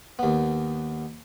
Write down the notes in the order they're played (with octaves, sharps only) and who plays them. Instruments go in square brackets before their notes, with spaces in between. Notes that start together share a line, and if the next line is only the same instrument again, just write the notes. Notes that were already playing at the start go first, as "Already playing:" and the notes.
[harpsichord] D#2 B3